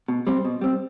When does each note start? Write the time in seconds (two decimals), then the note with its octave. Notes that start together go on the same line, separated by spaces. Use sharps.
0.08 B2
0.27 G3 C4
0.45 B2
0.61 G3 C4